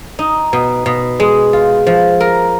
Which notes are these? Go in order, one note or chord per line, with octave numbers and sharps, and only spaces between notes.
D#4
B2
B2
G#3
F4
F3
A#4